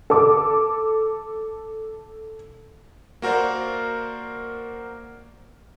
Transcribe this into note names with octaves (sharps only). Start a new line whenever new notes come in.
A4 D6
A#3 F#4 A#4 C5 D5